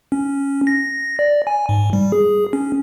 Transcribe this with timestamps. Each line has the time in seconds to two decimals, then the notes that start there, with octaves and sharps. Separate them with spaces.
0.12 C#4
0.67 A#6
1.19 D5
1.47 G#5
1.69 G#2
1.93 G3
2.12 G#4
2.53 C#4